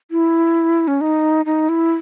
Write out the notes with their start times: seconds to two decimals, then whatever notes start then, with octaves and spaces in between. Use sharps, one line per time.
0.11 E4
0.88 C#4
1.01 D#4
1.46 D#4
1.69 E4